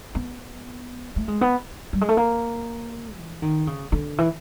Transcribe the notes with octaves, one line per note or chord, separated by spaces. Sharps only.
B3
A3
G#3
B3
G3
G#3
A3
A#3
E3
D#3
C#3
D3
E3